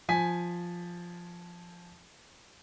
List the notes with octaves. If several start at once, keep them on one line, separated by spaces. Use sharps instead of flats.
F3 G#5 B6